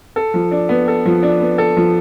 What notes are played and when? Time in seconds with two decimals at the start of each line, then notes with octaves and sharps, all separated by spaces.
0.16 A4
0.34 F3
0.51 D4
0.69 B3
0.88 A4
1.06 F3
1.23 D4
1.41 B3
1.58 A4
1.77 F3